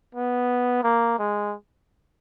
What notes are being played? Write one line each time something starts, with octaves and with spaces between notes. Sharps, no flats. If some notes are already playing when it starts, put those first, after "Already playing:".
B3
A#3
G#3